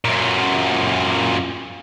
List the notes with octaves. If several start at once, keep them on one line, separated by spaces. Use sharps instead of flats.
F#2 A#2